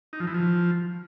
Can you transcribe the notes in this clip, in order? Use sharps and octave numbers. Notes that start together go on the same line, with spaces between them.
D#4
F3
E3
F3